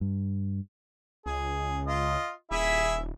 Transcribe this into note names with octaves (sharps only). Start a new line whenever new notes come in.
G2
C#2 G#4
F4 D#5
D#1 E4 G#4 E5